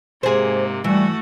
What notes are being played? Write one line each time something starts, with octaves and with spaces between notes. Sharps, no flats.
G#2 C3 A#3 G#4 C5
E3 G3 A3 F#4